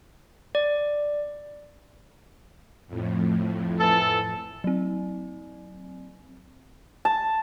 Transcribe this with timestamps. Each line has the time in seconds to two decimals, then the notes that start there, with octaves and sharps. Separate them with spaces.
0.55 D5
2.87 F2 A2
3.80 E3 A4
4.64 F#3 C4
7.05 A5